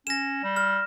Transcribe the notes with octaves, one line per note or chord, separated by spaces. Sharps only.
C#4 A#6 E7
G3
F6